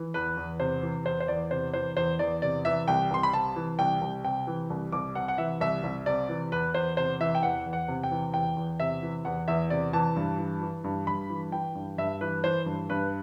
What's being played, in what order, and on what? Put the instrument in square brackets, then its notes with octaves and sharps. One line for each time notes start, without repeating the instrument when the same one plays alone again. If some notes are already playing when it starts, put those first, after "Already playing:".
Already playing: [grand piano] E3
E2 B4
E2
C3 C5
E3
E2 C5
C5
E2 D5
C3 C5
E3 C5
E2 C5
E2 D5
C3 D5
E3 E5
C2 G5
C2 C6
B5
C3 A5
E3
C2 G5
C2
C3 G5
E3
C2
C2 D6
C3 F#5
F#5
E3 E5
C2 E5
C2
C3 D5
E3
E2 B4
E2 C5
C3 C5
E3 E5
G5
E2 F#5
E2
F#5
C3
G5
E3
E2 G5
E2
C3 E5
E3
E2 F#5
E2 E5
C3 D5
E3 A5
G2
E3
E3
G2
G2 B5
E3
E3 G5
G2
G2 E5
E3 B4
E3 C5
G2
G2 B4